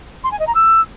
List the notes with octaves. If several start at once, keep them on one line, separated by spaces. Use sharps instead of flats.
C6
G#5
D#5
A#5
E6